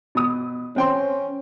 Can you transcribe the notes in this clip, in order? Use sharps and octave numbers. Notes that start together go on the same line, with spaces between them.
B2 D#6
C4 C#4 G5 C6